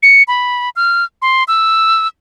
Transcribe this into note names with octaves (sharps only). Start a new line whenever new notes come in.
C#7
B5
F6
C6
E6